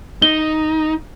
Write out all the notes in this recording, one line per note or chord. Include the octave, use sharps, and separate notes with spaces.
D#4 G7